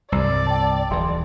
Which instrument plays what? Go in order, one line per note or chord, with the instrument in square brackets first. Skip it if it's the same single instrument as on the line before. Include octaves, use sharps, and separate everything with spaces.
[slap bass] C2 G2 [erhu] D5 [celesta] E6
[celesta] G5 A5
[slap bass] D#1 E3 [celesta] A5 C6